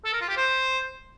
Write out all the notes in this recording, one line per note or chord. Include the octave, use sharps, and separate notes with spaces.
A4
A#4
F4
G4
C5